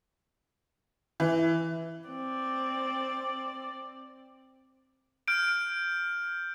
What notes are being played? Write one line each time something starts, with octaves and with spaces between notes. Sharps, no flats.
E3
C4 D5
F6 G6 D7